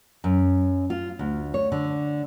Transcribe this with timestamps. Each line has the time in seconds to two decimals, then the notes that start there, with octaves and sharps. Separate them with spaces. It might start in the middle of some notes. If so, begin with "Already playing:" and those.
0.24 F#2
0.90 F4
1.19 D2
1.54 C#5
1.72 D3